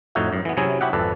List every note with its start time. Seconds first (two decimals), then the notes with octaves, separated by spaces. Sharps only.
0.15 F2 A2 D#4 F#4 C#5 E5
0.33 F#2
0.45 E3 B3
0.57 C3 F#3 C#4 E4 G#4
0.81 E4 F#4 G4 E5 F#5
0.93 G#1 F2 A4 B4 D5